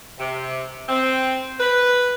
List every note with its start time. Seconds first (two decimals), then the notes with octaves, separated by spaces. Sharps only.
0.19 C3
0.89 C4
1.60 B4